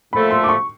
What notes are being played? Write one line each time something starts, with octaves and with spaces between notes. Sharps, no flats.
A#2 F3 A3 B5
C6
D6
C#6